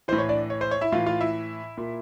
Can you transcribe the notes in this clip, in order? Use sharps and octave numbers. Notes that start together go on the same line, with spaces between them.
A2 E3 C5
C#5
D4 D5
C#5
C5
C#5
E4 E5
A2 E3 F4 F5
F4 F5
E4 E5
A#2